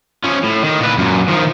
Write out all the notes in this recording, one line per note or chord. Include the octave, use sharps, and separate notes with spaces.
F3 C#4
A2
D#3
A#2 B4
F#2 A#2
D#3 F3